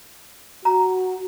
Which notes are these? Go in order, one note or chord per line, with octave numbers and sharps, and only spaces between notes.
F#4 A#5